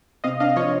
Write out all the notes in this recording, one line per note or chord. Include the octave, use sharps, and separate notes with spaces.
C3 D#5 F5
D4 D#5 F5
F3 C#5 D#5